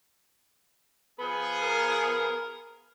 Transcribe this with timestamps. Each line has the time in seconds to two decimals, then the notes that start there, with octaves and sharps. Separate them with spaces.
1.19 F3 B3 G#4 B4
1.62 A#4